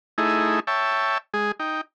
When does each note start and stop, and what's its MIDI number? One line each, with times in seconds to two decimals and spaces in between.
0.18 0.60 57
0.18 0.60 63
0.18 0.60 64
0.18 0.60 68
0.67 1.18 73
0.67 1.18 76
0.67 1.18 79
0.67 1.18 81
1.34 1.52 56
1.34 1.52 68
1.60 1.81 63
1.60 1.81 79